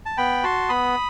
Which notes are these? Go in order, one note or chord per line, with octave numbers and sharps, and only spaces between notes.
A5
B3 G5 B5
F#4 A5 C6
B3 B5 D#6